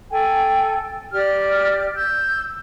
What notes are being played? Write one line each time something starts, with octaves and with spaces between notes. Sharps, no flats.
A4 G5 G#5
G4 D5 F6
E6 G6